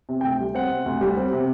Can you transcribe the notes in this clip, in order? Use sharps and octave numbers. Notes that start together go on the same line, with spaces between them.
C3
D2 G5
G3
C4 F#5
C3
D2
G3
C4
C3